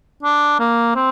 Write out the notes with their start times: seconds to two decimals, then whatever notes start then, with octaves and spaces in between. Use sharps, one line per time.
0.23 D4
0.59 A#3
0.96 C4